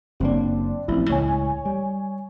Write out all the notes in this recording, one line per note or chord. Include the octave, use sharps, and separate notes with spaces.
F#1 F#3 A#3 C4 D4
A1 F3 C4 E4
C#2 A2 G#3 C#5 G#5
G3